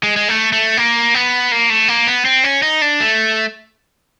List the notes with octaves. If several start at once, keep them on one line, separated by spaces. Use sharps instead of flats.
G#3
G#3
A3
A3
A#3
B3
A#3
A3
A#3
B3
C4
C#4
D#4
D4
A3